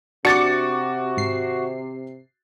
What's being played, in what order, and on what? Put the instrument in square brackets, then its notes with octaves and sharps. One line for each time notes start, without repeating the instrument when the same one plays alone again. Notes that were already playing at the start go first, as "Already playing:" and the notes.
[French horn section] C3 [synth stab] D4 [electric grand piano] F#4 [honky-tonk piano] D6 A6 C#7
[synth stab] G#1 C7